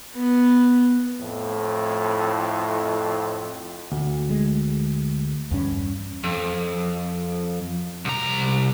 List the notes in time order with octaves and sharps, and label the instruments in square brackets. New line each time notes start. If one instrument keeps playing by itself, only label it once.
[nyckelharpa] B3
[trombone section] F2 A2
[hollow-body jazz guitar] D2
[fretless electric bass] G#3
E2 G2 C#4
[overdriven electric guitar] F2
C2 A#5